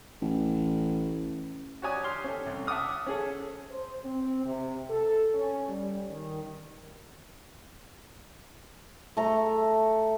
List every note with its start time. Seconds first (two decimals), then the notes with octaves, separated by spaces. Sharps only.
0.21 A1
1.82 F#4 G4 C#5 D5 G#5 D#6
2.04 G4 C6 F6
2.24 C#4 A4
2.46 C2
2.67 E5 F#5 A5 D6 D#6 F6
3.07 C#4 G#4 A4
3.71 C5
4.05 C4
4.45 C3
4.89 A4
5.34 C#4
5.68 G3
6.10 D#3
9.17 A3 A#5